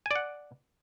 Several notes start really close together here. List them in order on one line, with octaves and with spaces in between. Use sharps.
G#5 D5 F#5